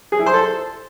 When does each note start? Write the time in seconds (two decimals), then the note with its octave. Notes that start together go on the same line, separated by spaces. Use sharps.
0.12 G#4
0.19 E4
0.26 C5
0.34 A4